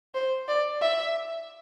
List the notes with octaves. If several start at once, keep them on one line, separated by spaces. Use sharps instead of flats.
C5
D5
E5